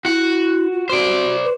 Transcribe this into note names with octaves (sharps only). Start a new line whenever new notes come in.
E4 F#4 F#5
F4
F#4 C5 D5
B4